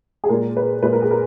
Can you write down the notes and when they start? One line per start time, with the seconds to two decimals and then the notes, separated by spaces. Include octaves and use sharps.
0.24 G#4
0.29 A#2 G#3 A#4
0.57 B4
0.82 A#2 G#3 B4
0.93 A#4
1.02 G#4
1.11 A#4